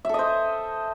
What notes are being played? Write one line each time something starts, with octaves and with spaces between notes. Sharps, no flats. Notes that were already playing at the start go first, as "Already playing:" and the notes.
A4 C5 D#5 E5